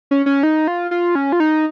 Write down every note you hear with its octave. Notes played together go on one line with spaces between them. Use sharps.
C#4
C#4
D#4
F4
F4
C#4
F4
D#4